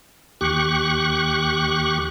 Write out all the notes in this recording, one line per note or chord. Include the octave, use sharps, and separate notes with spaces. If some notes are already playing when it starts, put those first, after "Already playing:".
D#2 G4 C#6 F#6